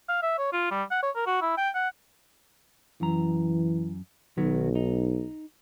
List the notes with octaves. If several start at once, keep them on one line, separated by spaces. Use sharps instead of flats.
F5
E5
C#5
F4
G3
F#5
C#5
A#4
F#4
E4
G5
F#5
F#2 E3 A#5
B1 D#3 F#3 B3
D#4